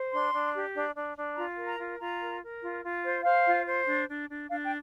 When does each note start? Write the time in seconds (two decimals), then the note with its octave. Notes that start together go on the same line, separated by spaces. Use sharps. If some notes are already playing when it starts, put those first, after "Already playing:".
Already playing: C5
0.11 D4 C6
0.33 D4
0.54 G4
0.74 D4
0.95 D4
1.16 D4
1.36 F4 A#5
1.57 A#4
1.68 A#5
1.79 F4
1.99 F4 A#5
2.20 A#4
2.41 A#4
2.62 F4
2.83 F4
3.04 C5
3.24 C5 F5
3.46 F4
3.66 C5
3.86 D4
4.08 D4
4.28 D4
4.50 D4 F5
4.64 G5